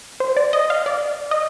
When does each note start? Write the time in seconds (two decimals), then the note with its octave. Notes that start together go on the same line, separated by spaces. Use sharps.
0.20 C5
0.37 D5
0.53 D#5
0.70 F5
0.86 D5
1.31 D#5